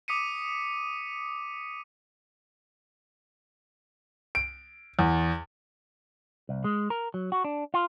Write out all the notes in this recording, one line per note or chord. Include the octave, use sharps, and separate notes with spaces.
D6 D#6 B6 C#7 D#7
D7
E2
C2
G#3
A#4
F#3
F#4
D4
F4